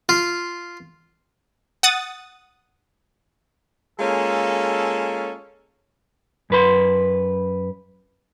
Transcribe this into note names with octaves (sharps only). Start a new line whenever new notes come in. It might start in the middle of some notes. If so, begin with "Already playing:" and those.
F4
F#5 D#6 A6
G#3 A#3 C#4 F4 A4
F#2 B4 C6